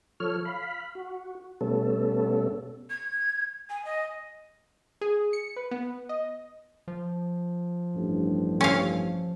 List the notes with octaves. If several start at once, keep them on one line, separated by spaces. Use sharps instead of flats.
F3 A4 C#5 F6
F5 B5
F#4
B2 G3 A3 B3 C#4 A4
G#6
G#5
D#5
G#4
C#7
B4
B3
D#5
F3
A1 G2
C#4 F5